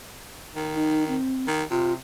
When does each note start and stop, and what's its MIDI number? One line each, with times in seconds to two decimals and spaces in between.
0.56 1.17 51
0.75 1.04 63
1.08 1.46 60
1.47 1.64 51
1.71 1.96 48
1.71 1.93 65